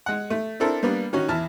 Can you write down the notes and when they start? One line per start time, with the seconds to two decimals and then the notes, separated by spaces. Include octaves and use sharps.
0.06 G#3 F#5
0.30 A3
0.60 C4 D4 E4 A4 A#4
0.83 G3 A#3 B3 D4
1.13 D#3 C#4 F#4
1.29 E2 E4 A5 F6